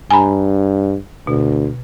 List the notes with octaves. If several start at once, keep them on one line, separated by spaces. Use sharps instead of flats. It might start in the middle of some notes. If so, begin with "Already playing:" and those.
G2 G#5 A#5 B5
D2 B2